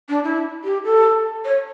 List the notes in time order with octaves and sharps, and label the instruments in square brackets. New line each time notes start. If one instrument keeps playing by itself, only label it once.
[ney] D4
E4
G4
A4
C#5